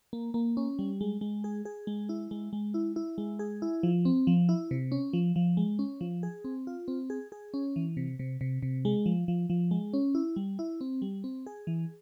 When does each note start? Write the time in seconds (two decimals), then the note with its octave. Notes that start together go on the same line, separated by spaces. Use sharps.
0.13 A#3
0.34 A#3
0.57 C#4
0.79 G3
1.01 G#3
1.21 G#3
1.44 G#4
1.65 G#4
1.87 G#3
2.09 E4
2.31 G#3
2.53 G#3
2.74 E4
2.96 E4
3.18 G#3
3.39 G#4
3.62 E4
3.83 F3
4.05 C4
4.27 F3
4.49 E4
4.71 C3
4.92 C#4
5.13 F3
5.36 F3
5.57 G#3
5.79 C#4
6.01 F3
6.23 G#4
6.44 C4
6.67 F4
6.88 C4
7.10 G#4
7.32 G#4
7.54 C#4
7.76 E3
7.97 C3
8.19 C3
8.41 C3
8.63 C3
8.85 G#3
9.06 F3
9.28 F3
9.50 F3
9.71 G#3
9.94 C#4
10.15 E4
10.36 G3
10.59 E4
10.81 C4
11.02 G3
11.24 C4
11.46 G#4
11.67 E3